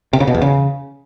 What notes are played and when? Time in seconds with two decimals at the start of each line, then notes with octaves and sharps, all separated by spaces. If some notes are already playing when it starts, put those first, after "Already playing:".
0.13 C3
0.20 C#3
0.27 B2
0.34 E2
0.42 C#3